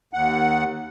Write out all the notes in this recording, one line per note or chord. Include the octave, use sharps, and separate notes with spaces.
D#2 F#5